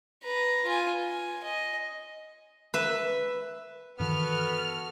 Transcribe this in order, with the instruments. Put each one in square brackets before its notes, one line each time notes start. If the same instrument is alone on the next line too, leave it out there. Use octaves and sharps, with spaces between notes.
[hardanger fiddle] B4 A#5
F4 G#5
G#5
D#5
[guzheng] B4 E5
[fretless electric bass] G2 D#3 E3 [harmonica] B3 [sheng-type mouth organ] F#4 A4 [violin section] F6